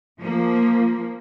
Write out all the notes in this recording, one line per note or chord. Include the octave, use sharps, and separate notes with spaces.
F3 A#3